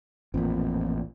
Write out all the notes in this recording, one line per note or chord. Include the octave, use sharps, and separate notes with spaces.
A1 F2 A#2